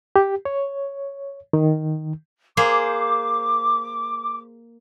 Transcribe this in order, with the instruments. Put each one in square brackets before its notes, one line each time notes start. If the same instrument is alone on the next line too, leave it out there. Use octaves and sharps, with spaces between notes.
[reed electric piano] G4
C#5
D#3
[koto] A#3 G#4 C5 [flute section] D6